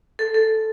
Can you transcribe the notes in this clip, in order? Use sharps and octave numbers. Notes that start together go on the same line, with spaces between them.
A4
A4